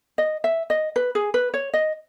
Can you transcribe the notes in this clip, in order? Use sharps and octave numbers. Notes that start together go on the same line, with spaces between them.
D#5
E5
D#5
B4
G#4
B4
C#5
D#5